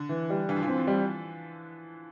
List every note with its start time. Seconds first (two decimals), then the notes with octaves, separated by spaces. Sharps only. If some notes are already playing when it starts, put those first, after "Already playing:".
Already playing: D3
0.09 E3
0.30 G3
0.49 G2 E3
0.56 F3
0.63 E3
0.68 C4
0.78 F3
0.87 G3